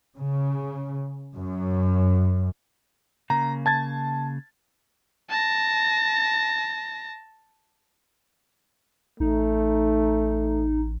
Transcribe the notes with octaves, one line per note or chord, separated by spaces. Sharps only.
C#3
F#2
C#3 A#3 A#5
A5 G#6 A6
A5 A#6
A1 A3 D#4